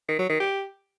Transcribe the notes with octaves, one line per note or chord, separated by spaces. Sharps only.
D#3
F#3
D#3
G4